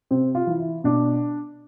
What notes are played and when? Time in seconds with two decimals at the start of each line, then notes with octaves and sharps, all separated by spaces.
0.11 C3 C4
0.35 F4
0.47 E3
0.60 E4
0.84 B2 D4